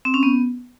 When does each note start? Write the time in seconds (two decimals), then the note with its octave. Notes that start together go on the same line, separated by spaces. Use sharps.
0.05 C4
0.14 C#4
0.23 B3